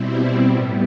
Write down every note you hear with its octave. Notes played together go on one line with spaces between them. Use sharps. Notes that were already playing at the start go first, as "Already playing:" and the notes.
Already playing: B2 G3 C4 E4
A2 G3 B3